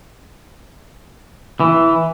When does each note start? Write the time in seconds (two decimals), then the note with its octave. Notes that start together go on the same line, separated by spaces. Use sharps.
1.60 E3